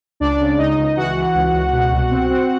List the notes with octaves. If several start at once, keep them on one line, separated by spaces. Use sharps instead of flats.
C#2 D4 D5
C#3
C#2 D#4 D#5
C#2
E3 F#4 F#5
E3
C#2
C#2
B2
C2
C4
C4